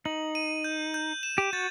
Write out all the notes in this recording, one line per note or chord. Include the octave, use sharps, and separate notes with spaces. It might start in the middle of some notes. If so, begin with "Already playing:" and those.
D#4 F#7
D#7
G6
G6
E7
G4
F#4 A6